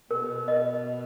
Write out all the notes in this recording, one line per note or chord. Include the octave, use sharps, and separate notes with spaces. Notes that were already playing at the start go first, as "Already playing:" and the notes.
B2 A#4
D#5